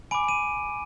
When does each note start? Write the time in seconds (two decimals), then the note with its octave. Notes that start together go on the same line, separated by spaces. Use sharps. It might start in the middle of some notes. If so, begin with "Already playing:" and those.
0.11 G#5 B5 D6 D7
0.29 D#7